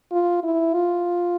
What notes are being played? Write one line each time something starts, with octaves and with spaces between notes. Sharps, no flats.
F4
E4
F4